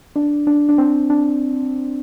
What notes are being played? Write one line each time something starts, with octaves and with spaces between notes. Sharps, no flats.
D4
D4
D4
C4
D4